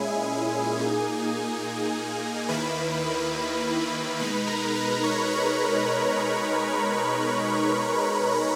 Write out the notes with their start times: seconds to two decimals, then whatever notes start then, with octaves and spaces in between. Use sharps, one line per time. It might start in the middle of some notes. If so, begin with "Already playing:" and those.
Already playing: A#2 G#3 C#4 E4 G#4 G#5
0.79 A#2 A#3 D#4
2.49 D#2 D#3 A#3 E4 B4 B5
4.19 B2 G#3 D#4 B4 B5
4.47 A#4 A#5
4.75 B4 B5
5.03 C#5 C#6
5.32 B4 B5